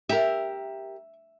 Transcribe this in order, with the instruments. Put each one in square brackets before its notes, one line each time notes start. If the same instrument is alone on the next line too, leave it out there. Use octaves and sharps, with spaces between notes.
[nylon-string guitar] G4 A#4 [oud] E5